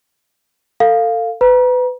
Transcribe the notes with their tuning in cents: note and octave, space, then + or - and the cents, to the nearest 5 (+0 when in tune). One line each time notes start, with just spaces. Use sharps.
A4 +30 F5 +0
B4 +25 A#5 +35